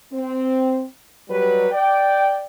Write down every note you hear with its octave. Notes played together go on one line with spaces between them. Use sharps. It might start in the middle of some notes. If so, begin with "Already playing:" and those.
C4
F#3 G3 B4
D5 G5